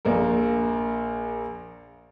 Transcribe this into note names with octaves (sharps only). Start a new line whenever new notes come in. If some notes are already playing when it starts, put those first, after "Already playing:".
A#1 A#3 A#4